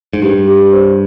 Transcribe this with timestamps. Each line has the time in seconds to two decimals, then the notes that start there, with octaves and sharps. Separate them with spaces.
0.13 G#2
0.22 G2 G4
0.48 G4
0.73 C5